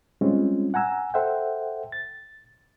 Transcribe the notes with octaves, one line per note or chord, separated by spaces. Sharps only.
G3 G#3 C4 C#4 F4
F#5 G#5 A#5 E6
A4 C5 E5 F#5 G5
A6